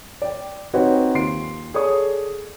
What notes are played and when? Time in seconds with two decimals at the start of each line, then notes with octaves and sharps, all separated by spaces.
0.22 D5 G5
0.74 C4 D#4 F#4 G4 B4 C#5
1.14 D#2 F4 C6 C7 D7
1.74 G#4 A4 C#5 D5 D#6